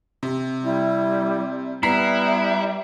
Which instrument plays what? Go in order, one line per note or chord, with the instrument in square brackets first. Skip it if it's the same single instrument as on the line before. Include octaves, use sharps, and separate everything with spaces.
[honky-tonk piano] C3
[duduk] G3 [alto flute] E4
[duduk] G3 [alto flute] B3 [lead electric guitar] E4 [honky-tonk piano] A#5 B6 C7